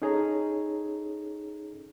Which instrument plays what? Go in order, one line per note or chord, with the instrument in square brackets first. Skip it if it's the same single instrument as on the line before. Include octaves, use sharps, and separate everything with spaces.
[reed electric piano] C#4 D#4 G#4 A4 C#5 A#5